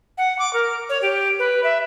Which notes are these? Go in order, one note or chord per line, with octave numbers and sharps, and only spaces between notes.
F#5
D6
A#4
C#5
G4
B4
E5